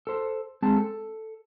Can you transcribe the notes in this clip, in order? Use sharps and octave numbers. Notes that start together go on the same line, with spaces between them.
A4 C5
G#3 C4 A5
A4